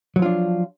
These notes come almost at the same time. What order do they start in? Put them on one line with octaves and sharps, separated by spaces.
F#3 F3 F4 D4